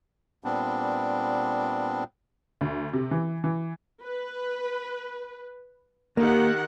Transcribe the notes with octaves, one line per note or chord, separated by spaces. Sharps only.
A#2 G3 B3 C4 D4
D2
C3
E3
E3
B4
D#3 A#3 G4 F#5